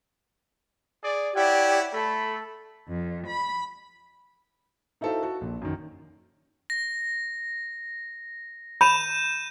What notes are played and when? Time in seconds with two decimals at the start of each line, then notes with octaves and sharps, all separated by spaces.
1.04 G#4 D5
1.35 E4 G4 C#5 D5 F#5 G#6
1.92 A3 A4 B5
2.88 F2
3.27 B5
5.01 D#4 E4 F#4 A4 C5 F5
5.23 F#4 A4
5.41 A#1
5.62 F#2 D#3
6.70 A#6
8.81 B5 G6 D#7 E7